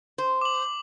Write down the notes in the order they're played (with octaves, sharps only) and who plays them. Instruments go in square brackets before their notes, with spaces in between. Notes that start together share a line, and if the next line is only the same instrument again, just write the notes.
[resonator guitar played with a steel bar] C5
[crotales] D6 F#7